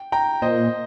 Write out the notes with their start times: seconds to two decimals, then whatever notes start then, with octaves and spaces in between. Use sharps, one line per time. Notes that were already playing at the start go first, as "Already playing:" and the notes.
Already playing: G5
0.12 G5 A#5
0.42 A#2 C5 D#5